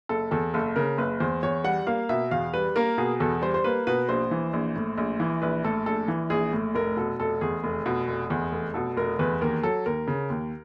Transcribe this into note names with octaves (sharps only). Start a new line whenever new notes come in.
F#1 A4
E2 A4
F#1 A4
C#3 A#4
F#1 B4
E2 C5
E2 C#5
G3 F#5
A#3 F5
B2 E5
E2 F5
G3 B4
A#3 A#4
B2 G#4
E2 A4
G3 C5
C5
A#3 B4
B2 B4
A#1 C5
E3
A#1
A2
A#1
E3
A#1 B4
A2 A4
A#1 A4
E3
A#1 G#4
A2
F1 A#4
B2 A4
F1 A4
E2 G#4
F1
B2
F1
E2
F1
B2 A4
F1 A#4
E2 B4
D#2 A#4
F#3 A4
D#2 A#4
C#3
D#2